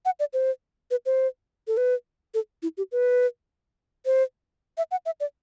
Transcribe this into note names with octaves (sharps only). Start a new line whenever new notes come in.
F#5
D5
C5
B4
C5
A4
B4
A4
E4
G4
B4
C5
E5
F#5
E5
D5